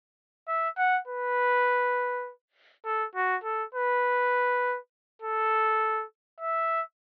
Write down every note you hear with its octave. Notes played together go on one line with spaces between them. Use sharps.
E5
F#5
B4
A4
F#4
A4
B4
A4
E5